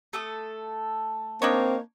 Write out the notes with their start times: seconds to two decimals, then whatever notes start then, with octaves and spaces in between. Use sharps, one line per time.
0.13 A3 A4 D#6
1.42 A#3 C4 D4 D#4 C#5